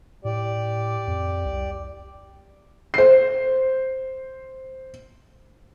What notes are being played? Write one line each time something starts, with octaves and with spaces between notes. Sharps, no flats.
A2 G4 D5
F2
C2
C5 C7